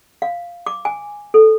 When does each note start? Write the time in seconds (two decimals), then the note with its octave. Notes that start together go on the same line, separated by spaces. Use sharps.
0.22 F5
0.66 D6
0.85 G#5
1.34 A4